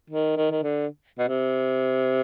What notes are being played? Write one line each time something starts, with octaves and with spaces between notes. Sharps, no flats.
D#3
D#3
D#3
D3
B2
C3